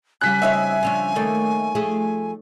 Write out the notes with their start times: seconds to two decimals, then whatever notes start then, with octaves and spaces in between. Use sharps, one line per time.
0.21 C#3 G3 G#5 F#6 B6
0.42 C4 D#4 C#5 E5
0.83 F3 C#4 D4
1.16 D#3 A3 A#3 D#4 A4 C#5
1.75 F3 A3 G#4